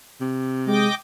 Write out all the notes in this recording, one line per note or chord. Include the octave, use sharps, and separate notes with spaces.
C3
G#3 D#5 G5 D6